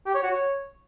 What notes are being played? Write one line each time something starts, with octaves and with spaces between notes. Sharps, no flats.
G4
C#5
F#4
C#5